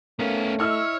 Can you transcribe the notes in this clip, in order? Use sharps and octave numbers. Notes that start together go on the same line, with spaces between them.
A3 B3 C#4 A#4 F5
E4 C#5 D#5 E5 E6 F6